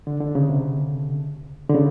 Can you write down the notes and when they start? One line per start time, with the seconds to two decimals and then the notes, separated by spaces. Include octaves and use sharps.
0.07 D3
0.20 D3
0.35 C#3
0.49 C3
1.70 D3
1.75 C#3